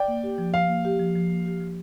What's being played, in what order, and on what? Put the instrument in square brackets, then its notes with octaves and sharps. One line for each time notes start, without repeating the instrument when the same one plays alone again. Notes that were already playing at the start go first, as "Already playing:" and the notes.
Already playing: [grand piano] D5 G5
[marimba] A#3
G4
F3
[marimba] F3 [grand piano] F5
[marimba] A#3
G4
F3
F3
A#3
G4
F3